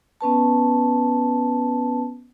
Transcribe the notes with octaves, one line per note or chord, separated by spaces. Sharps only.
B3 C#4 B4 A5